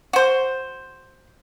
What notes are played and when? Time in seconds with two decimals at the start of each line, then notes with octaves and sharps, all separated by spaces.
0.13 F#4 C5